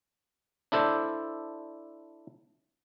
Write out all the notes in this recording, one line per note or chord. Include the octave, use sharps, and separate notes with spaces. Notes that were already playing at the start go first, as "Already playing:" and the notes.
D4 E4 A4 C5 D5